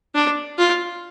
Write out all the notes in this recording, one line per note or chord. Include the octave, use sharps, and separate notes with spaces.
D4
F4